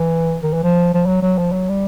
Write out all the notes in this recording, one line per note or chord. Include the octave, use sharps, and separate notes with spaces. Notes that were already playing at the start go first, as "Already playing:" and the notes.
Already playing: E3
D#3
E3
F3
F3
F#3
F#3
F3
F#3
G3